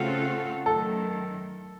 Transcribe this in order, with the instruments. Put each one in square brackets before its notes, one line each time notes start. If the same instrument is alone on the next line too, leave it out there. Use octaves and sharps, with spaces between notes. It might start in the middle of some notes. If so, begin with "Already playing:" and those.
Already playing: [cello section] C#3 A3 C4 F4 A4 [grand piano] F#4
[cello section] F#2 D#3 A3 [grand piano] A4